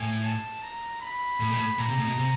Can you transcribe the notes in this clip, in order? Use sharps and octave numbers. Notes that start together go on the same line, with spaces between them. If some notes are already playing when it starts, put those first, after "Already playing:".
Already playing: A2 G#5
A5
A#5
B5
A2
A#2
A2
A#2 A#5
C3
A2
B2
C3